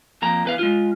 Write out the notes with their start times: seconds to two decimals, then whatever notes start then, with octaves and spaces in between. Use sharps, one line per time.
0.22 F2 A#3 A#5
0.45 E2 B4 F5
0.59 G#3 F4